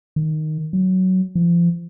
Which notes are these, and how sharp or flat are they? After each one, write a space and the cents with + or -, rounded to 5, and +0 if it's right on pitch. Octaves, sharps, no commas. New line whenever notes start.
D#3 -5
F#3 +10
F3 -30